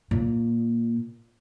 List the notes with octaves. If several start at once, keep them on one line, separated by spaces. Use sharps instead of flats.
A#2